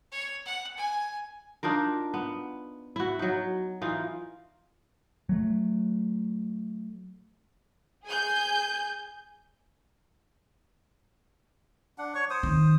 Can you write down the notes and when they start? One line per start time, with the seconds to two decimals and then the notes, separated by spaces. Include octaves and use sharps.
0.12 C#5
0.46 F#5
0.77 G#5
1.63 D4 D#4 F4 A#4
2.14 B3
2.96 E4 F#4
3.19 F#3 D#4
3.82 E3 D#4 F4
5.29 F#3 A3
8.06 G#4 G#5 G6
11.98 D4 F#5
12.15 C#5 C#6
12.30 C5 D#6
12.43 D#3